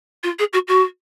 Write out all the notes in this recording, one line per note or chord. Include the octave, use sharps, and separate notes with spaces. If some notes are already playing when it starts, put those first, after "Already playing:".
F4
G#4
F#4
F#4